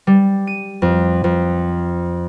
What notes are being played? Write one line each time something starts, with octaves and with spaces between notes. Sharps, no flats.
G3
D#7
F2
F2